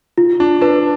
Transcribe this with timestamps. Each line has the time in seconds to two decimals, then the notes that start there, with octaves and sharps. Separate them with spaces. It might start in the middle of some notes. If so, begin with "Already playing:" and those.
0.18 F4
0.40 D4
0.61 D4 B4